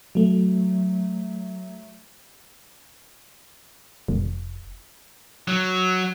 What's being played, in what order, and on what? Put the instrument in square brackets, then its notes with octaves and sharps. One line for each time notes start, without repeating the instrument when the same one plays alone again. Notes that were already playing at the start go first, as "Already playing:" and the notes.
[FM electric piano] F#3 A3
[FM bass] F1
[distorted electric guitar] F#3